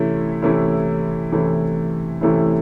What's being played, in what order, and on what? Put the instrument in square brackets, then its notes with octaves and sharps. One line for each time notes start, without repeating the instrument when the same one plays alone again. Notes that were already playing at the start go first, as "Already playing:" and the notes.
Already playing: [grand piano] C3 E3 A3 C#4 E4
C3 E3 A3 C#4 E4
C3 E3 A3 C#4 E4
C3 E3 A3 C#4 E4